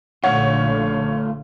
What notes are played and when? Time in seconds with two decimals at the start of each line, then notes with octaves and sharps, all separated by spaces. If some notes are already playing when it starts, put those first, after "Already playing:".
0.24 A#1 D3 A3 F4 C#5 F#5